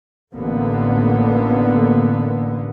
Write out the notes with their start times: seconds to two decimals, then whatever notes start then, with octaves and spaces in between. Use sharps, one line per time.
0.34 A1 D3 A#3 B3